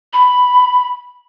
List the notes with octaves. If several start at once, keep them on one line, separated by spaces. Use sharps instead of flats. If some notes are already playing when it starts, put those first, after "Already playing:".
B5